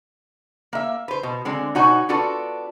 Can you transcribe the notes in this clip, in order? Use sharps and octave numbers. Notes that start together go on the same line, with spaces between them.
A#3 E5
B4 C5
B2
D3 G#3 C4
B2 D#4 F#4 C#5 G#5
B3 D4 F4 F#4 A4